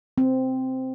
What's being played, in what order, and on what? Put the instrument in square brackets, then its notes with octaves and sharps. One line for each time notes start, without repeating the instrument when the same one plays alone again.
[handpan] C4